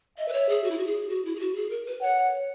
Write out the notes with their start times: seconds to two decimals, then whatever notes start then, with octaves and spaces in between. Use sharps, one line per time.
0.18 D#5 E5
0.28 B4
0.33 C#5
0.49 G#4
0.64 F#4
0.71 E4
0.78 F#4
0.86 G#4
1.09 F#4
1.25 E4
1.36 G#4
1.40 F#4
1.56 G#4
1.70 A#4
1.86 B4
2.02 C#5 F#5